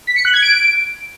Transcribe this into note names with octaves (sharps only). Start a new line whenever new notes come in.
B6
C#7
F#6
G#6
D7